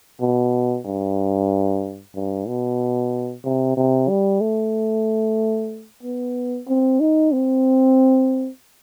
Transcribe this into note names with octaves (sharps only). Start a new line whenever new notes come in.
B2
G2
G2
B2
C3
C3
G3
A3
B3
C4
D#4
C4